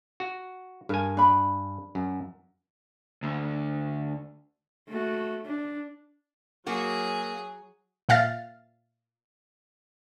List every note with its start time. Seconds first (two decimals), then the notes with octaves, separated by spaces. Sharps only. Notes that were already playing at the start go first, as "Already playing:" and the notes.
0.20 F#4
0.89 G2 A#4 G#5
1.17 D4 B5
1.95 F#2
3.23 D2
4.88 A3 F#4
5.44 D4
6.67 F#3 A#3 F#4 G#4
8.09 A#2 E5 F5 F6 A6